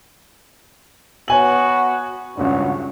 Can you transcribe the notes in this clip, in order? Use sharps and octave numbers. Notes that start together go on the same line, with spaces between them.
B3 F#4 C#5 G#5 F#7
G#1 C#2 G2 C#4 F#4